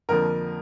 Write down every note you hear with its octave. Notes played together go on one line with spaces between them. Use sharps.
F2 D3 F3 A#3 A#4